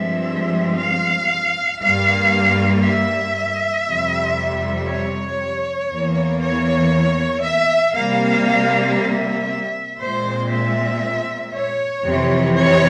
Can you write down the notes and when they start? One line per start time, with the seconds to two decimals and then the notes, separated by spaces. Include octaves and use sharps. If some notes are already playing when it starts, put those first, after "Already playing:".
Already playing: G2 F3 G#3 C4 E5
0.79 F5
1.81 G2 G3 A#3 F5
2.83 E5
3.85 F2 C3 G3
4.89 C#5
5.91 E2 E3 A#3
6.41 C#5
7.44 E5
7.95 C3 G3 A#3 F5
8.97 E5
10.00 A#2 G#3 C4 C5
10.52 E5
11.54 C#5
12.05 F2 C3 E3
12.56 C#5